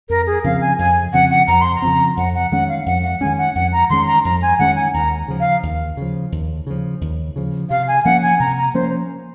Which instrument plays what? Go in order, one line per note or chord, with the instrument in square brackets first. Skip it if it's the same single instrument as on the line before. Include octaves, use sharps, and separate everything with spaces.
[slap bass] F2 [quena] A#4
[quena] G#4
[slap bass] C#3 F3 C4 [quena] F5
[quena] G#5
[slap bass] F2 [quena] G#5
[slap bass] C#3 F3 C4 [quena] F#5
[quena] F#5
[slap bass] F2 [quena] A#5
[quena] C6
A#5
[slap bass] C#3 F3 C4
[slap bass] F2 [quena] F#5
[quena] F#5
[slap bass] D#3 G#3 C#4 [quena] F#5
[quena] F5
[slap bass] F2 [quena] F#5
[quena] F#5
[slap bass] D#3 G#3 C#4 [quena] G#5
[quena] F#5
[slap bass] F2 [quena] F#5
[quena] A#5
[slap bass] D#3 G#3 C#4 [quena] C6
[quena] A#5
[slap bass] F2 [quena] A#5
[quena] G#5
[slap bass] D#3 G#3 C#4 [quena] F#5
[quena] G#5
[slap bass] D#2 [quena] A#5
[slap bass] C#3 F3
[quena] F5
[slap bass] D#2
C#3 F3
D#2
C#3 F3
D#2
C#3 F3
[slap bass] C3 [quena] F5
[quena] G#5
[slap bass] F3 A#3 C#4 [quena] F#5
[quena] G#5
[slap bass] C3 [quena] A#5
[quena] A#5
[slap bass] F3 A#3 C#4 [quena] C5